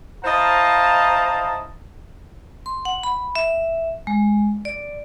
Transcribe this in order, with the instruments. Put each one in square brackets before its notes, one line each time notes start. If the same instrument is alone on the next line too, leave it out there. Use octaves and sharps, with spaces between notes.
[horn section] E4 C5 D#5 F5 A5 A#5
[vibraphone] C6
F#5
B5
E5
G#3
D5